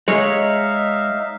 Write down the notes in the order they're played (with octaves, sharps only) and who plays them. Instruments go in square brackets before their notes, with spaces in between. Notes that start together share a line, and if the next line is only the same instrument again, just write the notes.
[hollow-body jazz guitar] G#3 [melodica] D#4 E5 F5 [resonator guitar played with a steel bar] C#5